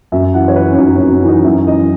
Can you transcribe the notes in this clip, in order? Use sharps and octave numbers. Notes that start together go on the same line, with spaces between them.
F#2 E5
E3 F#5
C#5
E3 B4
C#4
F#2 D#4
C#4
F#2
C#4
E3
D#4
F#2 E4
E3 D#5